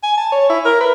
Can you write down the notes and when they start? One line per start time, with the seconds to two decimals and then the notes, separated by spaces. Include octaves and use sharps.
0.03 G#5
0.17 A5
0.32 C#5
0.49 E4
0.65 A#4
0.81 B4